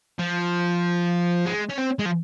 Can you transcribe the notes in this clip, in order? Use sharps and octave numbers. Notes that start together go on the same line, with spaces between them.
F3
G#3
C#4
C4
G#3
F3